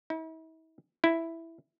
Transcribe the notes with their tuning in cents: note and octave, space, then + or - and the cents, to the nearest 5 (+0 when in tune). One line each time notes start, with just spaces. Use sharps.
E4 -45
E4 +0